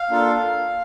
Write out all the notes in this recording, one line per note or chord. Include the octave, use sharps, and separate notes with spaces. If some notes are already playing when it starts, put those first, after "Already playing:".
Already playing: F5
A#3 D4 F4 A4